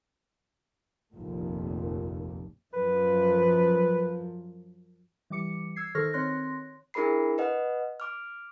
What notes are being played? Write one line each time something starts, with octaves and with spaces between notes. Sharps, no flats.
F1 A#1 D#2
F#2 F3 B4
E3 G3 D6 C#7
E6 G#6 C7
D#3 A4 C5 C#6 F6 A#6
D#3 C4 C#5 C6 F#6 A#6
D4 E4 G#4 A#4 B5 C7
B4 D#5 F#5
D6 F6